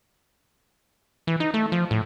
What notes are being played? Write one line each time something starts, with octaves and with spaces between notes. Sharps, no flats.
E3
D#4
A3
F3
A2